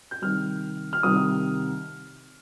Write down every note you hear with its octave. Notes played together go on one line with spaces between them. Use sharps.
G6
C2 C3 D#3 F6
F6
C2 C3 D#3 D#6